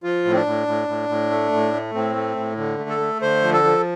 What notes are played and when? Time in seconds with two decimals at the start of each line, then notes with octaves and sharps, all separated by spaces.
0.03 F3 F4
0.25 A2
0.32 C4
0.35 D4
0.46 A2
0.67 A2
0.88 A2
1.09 A2
1.30 A3
1.52 A2
1.73 A3
1.94 A2 C4
2.15 A3
2.37 A2
2.57 D3
2.79 A3
2.89 A4
3.00 A3
3.22 D3 C5
3.43 F3
3.53 A4
3.64 F3